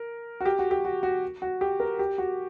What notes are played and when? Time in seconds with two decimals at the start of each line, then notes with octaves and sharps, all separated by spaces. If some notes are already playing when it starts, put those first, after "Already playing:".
Already playing: A#4
0.41 F#4
0.46 G4
0.59 F#4
0.71 G4
0.85 F#4
1.03 F#4
1.42 F#4
1.61 G4
1.80 A#4
1.99 G4
2.18 F#4